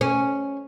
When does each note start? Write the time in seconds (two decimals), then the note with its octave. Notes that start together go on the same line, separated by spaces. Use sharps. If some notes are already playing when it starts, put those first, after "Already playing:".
0.01 C#4